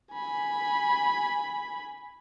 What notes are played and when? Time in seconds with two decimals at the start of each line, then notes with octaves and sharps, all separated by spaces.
0.12 G#5 B5